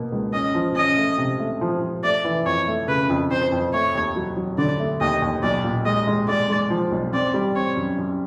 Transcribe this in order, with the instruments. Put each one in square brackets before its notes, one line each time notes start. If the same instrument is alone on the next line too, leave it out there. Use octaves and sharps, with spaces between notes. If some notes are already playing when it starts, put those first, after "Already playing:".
Already playing: [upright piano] B2 A#3
C#2
[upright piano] C#4 [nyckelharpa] D#5
[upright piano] F3
[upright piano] C#4 [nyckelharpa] D#5
[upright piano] A3
C3
A3
F3
F3
[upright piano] A3 [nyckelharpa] D5
[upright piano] E3
[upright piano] F2 [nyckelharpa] C#5
[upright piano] A3
[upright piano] C#3 [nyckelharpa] B4
[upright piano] F2
[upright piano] F2 [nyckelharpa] C5
[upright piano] F2
[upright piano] A3 [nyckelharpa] C#5
[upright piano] D#2
F#3
F#3
[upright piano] D3 [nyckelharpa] D5
[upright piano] A3
[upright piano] D#2 [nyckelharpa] D#5
[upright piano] D#2
[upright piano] B1 [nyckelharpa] D5
[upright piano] A#2
[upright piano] G#3 [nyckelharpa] D#5
[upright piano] G#3
[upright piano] G#3 [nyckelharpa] D5
[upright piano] G#3
F3
B1
[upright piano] C4 [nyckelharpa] D5
[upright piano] G3
[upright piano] C4 [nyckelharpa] C#5
[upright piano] F#2
F#2